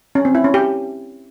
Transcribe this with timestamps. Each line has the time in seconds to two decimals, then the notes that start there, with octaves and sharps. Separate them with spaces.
0.15 C#4
0.25 C4
0.35 E4
0.44 C#4
0.54 G4